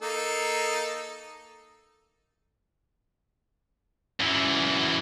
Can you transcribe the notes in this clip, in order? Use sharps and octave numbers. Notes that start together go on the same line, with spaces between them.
A#3 D#4 A4
F#2 E3